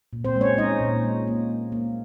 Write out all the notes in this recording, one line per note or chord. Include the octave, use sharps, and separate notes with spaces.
A#2
C4 C5
G#3
C#4 C#5
G#3 D#4 D#5
A#2
G#3
A#3
A#3
A#3